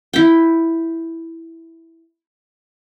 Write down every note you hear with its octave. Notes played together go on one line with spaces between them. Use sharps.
E4 G5